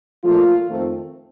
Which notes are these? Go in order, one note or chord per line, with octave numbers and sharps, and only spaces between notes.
A#2 F3 A3 F4
F2 D#3 A3 C4